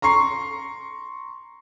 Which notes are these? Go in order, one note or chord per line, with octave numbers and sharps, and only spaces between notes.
A#5 C6 C#6 C7